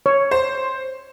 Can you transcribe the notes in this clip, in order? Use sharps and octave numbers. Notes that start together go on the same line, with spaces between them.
C#5
C5